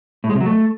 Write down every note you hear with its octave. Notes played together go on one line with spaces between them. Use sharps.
A2
G#3
C3
F#3
A3